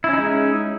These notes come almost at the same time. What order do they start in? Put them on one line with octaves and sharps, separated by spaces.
E4 C#4 D#4 G#3